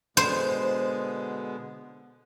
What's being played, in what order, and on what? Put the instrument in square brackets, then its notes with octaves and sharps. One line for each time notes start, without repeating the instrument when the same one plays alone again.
[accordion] B2 D3 G#3 [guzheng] C5